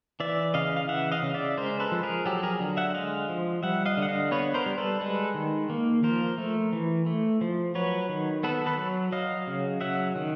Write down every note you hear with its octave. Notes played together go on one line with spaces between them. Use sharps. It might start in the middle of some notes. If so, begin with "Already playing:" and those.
E3 D5 E5
C#3 D#5 F5
F5
E3 E5 F#5
D#5 F5
C#3
D5 E5
G#3 A#4 C5
A4 B4
F3
G#4 A#4
F#3 G4 A4
G#4 A#4
D3
E5 F#5
G#3 D#5 F5
F3
G3 E5 F#5
D#5 F5
D3
F#5
D#5 F5
B3 B4 C#5
A#4 C5
G3
A4 B4
G#3 A4 B4
D#3
A#3
F3 A#4 C5
A3
E3
A3
F3
F#3 B4 C#5
D#3
B3 A4 B4
A4 B4
F#3
F#3 D#5 F5
C#3
F#3 E5 F#5
D#3